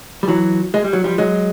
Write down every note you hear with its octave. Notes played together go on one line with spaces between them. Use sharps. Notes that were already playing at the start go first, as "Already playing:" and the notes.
G3
E3 F#3
G#3
G3
F#3
F3 G3
F#3 G#3